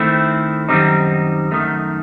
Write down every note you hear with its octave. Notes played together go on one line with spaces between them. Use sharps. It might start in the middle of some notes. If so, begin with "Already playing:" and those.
Already playing: D#3 A3 C4 E4
F#2 D#3 G3 C4 D#4
F#2 D#3 A3 D#4